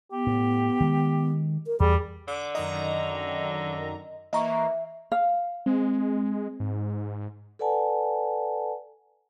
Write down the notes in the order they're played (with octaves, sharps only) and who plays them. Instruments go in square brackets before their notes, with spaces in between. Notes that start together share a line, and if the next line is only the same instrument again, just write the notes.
[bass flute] B3 [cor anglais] G4
[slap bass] A2
D#3 G#3
[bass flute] A#4
[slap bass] E2 [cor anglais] G3 [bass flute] G#4
[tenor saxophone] D3 [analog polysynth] D6
[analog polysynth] F#2 D#3 A#5 [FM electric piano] D#5
[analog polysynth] E3 A#3 [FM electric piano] D#5 A#5 C#6 [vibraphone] E5
[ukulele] F5
[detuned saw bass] G#3 [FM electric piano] C4
[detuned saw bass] G#2
[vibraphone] A4 B4 D5 F#5 G#5 A5